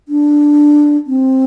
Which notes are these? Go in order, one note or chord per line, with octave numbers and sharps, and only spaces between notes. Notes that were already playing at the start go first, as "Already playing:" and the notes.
D4
C4